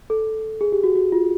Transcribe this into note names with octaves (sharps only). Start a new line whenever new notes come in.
A4
G#4
G4
F#4
F#4
F4